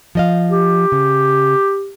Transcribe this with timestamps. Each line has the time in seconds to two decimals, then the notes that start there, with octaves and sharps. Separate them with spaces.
0.15 F3 D#5 F5
0.50 G4
0.92 C#3